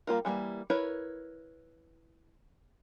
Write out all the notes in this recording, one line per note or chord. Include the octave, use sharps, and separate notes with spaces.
G3 A#3 F4 A#4
E3 G3 A3 A#3
E4 A#4 B4 C#5